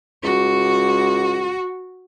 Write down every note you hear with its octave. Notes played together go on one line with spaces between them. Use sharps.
C#2 F#4